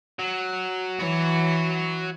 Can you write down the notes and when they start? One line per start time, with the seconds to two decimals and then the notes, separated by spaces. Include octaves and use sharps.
0.19 F#3
0.99 E3 F#4 C#5